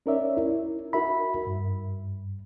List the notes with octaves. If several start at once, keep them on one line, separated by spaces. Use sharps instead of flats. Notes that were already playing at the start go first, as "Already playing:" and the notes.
C#4 D#4 A#4 C#5 D5 E5
E4
D#4 F#4 A#4 E5 B5
G2